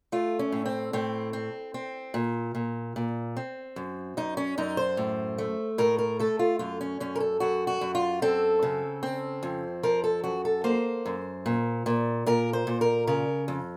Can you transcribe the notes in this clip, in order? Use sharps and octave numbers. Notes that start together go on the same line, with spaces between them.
A3 F4
C#4
A2
C4
A2 C4
C4
C4
A#2
A#2
A#2
C4
F#2
F#2 D#4
C#4
F#2 D#4
C5
A2
A3
A2 A#4
A#4
A3 A4
F4
F#2 F4
C#4
F#2 C#4
A#4
A4
F#2 F#4
F#4
F#2
F4
C4 A4
C#3
C4
F2
F3 A#4
A4
F#2 F#4
A4
A#3 C5
F#2
A#2
A#2
A#2 A#4
C5
A#2
A#4
C#3 A#4
F2